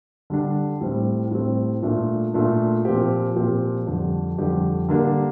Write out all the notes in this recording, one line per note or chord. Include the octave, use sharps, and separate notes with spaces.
D3 G3 D4
A2 G3 C4
A2 G3 C4
A#2 A3 D4 F4
A#2 A3 D4 F4
A#2 F3 C4 G4
A#2 F3 C4 G4
F2 D3 G3 D4 G4
F2 D3 G3 D4 G4
D3 G3 A#3 D4 G4